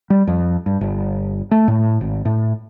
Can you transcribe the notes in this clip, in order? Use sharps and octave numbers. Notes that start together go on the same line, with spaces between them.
G3
F2
G2
G1
A3
A2
G#1
A2